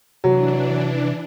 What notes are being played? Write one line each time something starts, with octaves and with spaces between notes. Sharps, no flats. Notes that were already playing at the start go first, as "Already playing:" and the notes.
C3 E3 F#3 D4